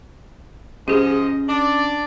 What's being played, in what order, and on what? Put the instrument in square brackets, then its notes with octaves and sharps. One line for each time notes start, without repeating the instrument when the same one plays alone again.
[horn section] G#2 F3 D#5 [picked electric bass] C#4 [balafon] G4 G#4
[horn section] D4 D5